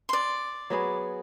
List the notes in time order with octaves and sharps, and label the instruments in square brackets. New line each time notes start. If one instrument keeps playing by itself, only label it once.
[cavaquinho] D5 C6
[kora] F#3 B3 G#4